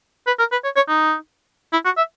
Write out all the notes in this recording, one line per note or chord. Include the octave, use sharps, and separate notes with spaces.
B4
A#4
B4
C#5
C#5
D#4
E4
F#4
E5